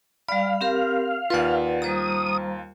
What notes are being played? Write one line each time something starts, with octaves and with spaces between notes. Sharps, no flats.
G3 D5 F5 B5
C4 G4 A#4
D#2 F4 B4 D5 F#5
G3 C5 A#5 D#6